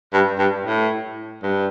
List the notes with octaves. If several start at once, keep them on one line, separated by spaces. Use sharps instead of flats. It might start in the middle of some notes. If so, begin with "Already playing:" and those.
G2
G2
A2
G2